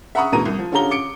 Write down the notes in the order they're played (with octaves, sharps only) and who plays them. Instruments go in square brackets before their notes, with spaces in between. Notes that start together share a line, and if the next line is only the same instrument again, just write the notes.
[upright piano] E5 F#5 A#5 B5 C#6 D#6
D2 B2 E3 A#5 D#7
C2
F3
D3 C#4 F4 G4 A#5 G7
D6 C#7 D7